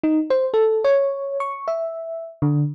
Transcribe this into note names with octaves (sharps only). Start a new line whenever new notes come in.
D#4
C5
A4
C#5
C#6
E5
D3